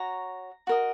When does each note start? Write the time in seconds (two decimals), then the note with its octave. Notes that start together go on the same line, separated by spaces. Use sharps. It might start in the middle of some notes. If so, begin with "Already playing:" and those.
Already playing: F#4 C#5 A#5
0.67 F#4 A#4 D#5